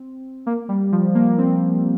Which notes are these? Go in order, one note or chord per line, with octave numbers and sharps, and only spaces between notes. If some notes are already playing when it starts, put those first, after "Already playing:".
Already playing: C4
A#3
G3
F3
A#3
C4